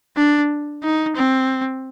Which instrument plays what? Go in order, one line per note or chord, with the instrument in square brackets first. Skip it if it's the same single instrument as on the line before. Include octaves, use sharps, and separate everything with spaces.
[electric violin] D4
D#4
C4